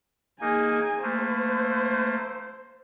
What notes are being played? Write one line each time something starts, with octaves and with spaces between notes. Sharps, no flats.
A#3 D#4 G#4 G#5
A3 A#3 C5